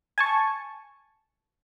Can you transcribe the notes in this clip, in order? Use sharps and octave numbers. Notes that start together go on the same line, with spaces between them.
G#5 A5 C#6